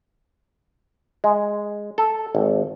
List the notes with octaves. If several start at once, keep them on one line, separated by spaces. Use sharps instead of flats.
G#3
A4
G#1